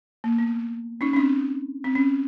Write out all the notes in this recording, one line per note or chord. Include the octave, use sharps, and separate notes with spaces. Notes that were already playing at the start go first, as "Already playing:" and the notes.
A#3
B3
C#4 D#4
C#4
C4 D4
C4
C#4